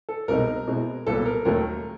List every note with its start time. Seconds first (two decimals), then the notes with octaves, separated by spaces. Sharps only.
0.09 A4
0.28 C2 B2 G#3 C4 D#4 A#4
0.67 B2 G#3 C4 E4
1.07 C2 A#2 F#3 B3 A4
1.26 A#4
1.45 D#2 D#3 F#3 A3 A#4